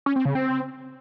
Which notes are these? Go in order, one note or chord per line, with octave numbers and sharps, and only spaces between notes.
C#4
C4
C#3
C4